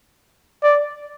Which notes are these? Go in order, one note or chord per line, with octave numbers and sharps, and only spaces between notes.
D5